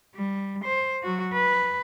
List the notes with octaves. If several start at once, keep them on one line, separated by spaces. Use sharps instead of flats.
G3
C5
F#3 F#4
B4